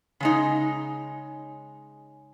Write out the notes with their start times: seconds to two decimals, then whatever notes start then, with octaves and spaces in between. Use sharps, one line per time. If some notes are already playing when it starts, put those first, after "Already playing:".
0.20 C#3 G#3 D#4